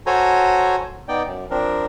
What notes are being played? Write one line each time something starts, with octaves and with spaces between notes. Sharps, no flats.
F#4 A4 C5 C#5 G#5 A#5
B3 D#4 D5 G5
F#2
F3 C4 D4 A#4